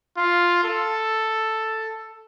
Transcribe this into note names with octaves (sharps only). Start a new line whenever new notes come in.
F4
A4